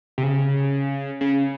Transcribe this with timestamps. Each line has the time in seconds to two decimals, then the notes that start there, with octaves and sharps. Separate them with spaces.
0.18 C3
0.23 C#3
1.21 C#3